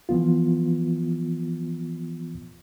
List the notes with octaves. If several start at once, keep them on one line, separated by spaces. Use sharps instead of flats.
E3 F3 B3 F4